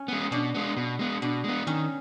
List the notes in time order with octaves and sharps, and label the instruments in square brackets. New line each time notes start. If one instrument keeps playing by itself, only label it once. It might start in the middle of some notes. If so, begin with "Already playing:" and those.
Already playing: [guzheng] C#4
[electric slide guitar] G#3 B3
[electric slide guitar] B2 [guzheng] D4
[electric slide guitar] G#3 B3
B2
G#3 B3
[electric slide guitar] B2 [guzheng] D4
[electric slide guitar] G#3 B3
[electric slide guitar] D#3 [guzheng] C#4